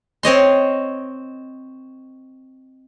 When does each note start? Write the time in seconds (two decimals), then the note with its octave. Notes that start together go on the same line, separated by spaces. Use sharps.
0.23 C4 C#5 D#5 C6